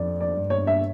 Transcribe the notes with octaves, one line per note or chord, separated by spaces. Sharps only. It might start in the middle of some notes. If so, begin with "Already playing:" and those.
Already playing: F2 D5
D5
G2
C#5
E5